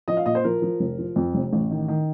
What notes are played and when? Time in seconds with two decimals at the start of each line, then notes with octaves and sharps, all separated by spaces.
0.08 F3 D#5
0.17 F5
0.26 A#2 D#5
0.35 C5
0.44 F3 A#4
0.62 F3
0.80 F1
0.99 F3
1.16 F2
1.34 F1
1.53 A1
1.71 D#3
1.88 D#3